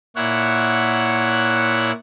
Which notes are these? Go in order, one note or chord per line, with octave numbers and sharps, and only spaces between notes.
A#2 E4 C#5 F#5 F#6